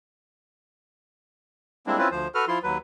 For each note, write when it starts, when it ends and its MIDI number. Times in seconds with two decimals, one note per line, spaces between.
1.87 1.98 55
1.87 1.98 56
1.87 1.98 58
1.87 1.98 60
1.87 1.98 62
1.87 1.98 64
1.98 2.08 60
1.98 2.08 61
1.98 2.08 64
1.98 2.08 65
1.98 2.08 71
2.11 2.28 38
2.11 2.28 53
2.11 2.28 72
2.35 2.45 66
2.35 2.45 69
2.35 2.45 71
2.35 2.45 89
2.48 2.59 53
2.48 2.59 64
2.48 2.59 65
2.48 2.59 84
2.63 2.78 39
2.63 2.78 54
2.63 2.78 71